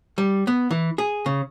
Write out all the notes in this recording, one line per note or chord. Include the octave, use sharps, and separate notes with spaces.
G3
B3
E3
G#4
C#3